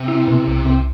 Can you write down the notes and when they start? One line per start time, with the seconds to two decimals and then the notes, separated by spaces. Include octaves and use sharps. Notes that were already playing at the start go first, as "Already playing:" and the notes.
Already playing: C3
0.08 E4
0.28 B2
0.47 C2
0.66 C2